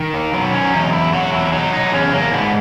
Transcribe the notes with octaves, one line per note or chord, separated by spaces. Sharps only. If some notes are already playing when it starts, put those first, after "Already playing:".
Already playing: D#3
A#3
F#3 B3
C#4
E2 D#4
E4
F#3 F#4
E4
F#3 D#4
D#4
E2 C#4
A#3
G#2 B3